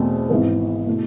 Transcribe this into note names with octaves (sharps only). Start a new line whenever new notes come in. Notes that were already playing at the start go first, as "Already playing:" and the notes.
Already playing: E2 B2 A3 C4
G#1 G#2 E3 B3
B2 A3 E4